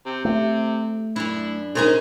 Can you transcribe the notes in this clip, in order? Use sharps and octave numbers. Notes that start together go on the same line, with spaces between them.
C3
C3 A3
F#2 D4 E4
C#3 D#4 A#4 C5